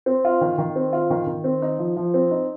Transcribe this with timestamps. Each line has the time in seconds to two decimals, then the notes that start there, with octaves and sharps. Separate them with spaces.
0.06 C4
0.25 F4
0.41 D#3
0.58 D#3
0.76 C4
0.93 F4
1.10 D#3
1.27 D#3
1.44 C4
1.62 D#4
1.79 F3
1.97 F3
2.14 C4
2.31 D#4